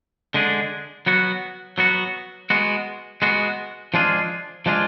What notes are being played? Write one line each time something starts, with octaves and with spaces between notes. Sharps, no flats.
D3 G#3 D4 G#4
F#3 B3 F#4
F#3 B3 F#4
G#3 B3 F#4
G#3 B3 F#4
F3 G#3 D4 F4 G#4
F3 G#3 D4 F4 G#4